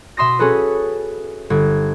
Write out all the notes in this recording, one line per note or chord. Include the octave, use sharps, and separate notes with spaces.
B2 E5 C6 D#6 A#6
C#4 F#4 G#4 A4 B4
G1 G#6